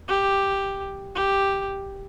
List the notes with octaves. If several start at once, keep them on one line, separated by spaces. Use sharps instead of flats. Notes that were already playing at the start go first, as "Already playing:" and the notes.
G4
G4